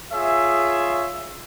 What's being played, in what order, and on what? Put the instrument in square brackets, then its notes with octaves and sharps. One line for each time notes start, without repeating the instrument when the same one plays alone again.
[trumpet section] F4 G#4 C#5 E5